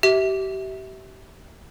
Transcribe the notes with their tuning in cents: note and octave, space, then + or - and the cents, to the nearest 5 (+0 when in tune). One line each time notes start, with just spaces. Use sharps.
G4 -35 E5 -20